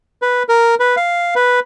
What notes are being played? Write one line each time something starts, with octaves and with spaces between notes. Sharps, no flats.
B4
A#4
B4
F5
B4